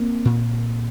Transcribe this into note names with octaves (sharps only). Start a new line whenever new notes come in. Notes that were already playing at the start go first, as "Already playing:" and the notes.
Already playing: A#3 C4
A#2